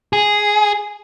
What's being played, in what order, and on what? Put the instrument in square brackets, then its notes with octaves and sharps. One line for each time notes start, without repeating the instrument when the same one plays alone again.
[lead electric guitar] G#4